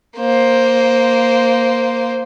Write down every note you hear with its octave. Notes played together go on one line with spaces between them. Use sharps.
A#3 C5